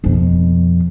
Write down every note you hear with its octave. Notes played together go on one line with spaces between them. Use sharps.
F2 B2